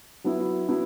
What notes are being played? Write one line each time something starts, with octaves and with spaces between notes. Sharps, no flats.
F#3 B3 E4
F#3 B3 E4